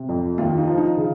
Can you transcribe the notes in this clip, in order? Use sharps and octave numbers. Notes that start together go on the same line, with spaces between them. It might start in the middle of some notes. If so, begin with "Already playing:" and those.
Already playing: C3
F2
D#2 F4
D#4
F3
D#4
C#3